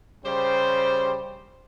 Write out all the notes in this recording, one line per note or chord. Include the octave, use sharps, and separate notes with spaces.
C#3 G3 G4 C5